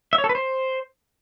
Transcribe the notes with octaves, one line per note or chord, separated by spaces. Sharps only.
E5
C#5
A4
B4
C5